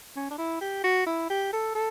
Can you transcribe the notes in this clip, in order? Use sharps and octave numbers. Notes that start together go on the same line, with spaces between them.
C#4
D4
E4
G4
F#4
E4
G4
A4
A4